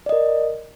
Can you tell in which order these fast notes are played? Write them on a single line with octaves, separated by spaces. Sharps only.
D5 D#5 A#4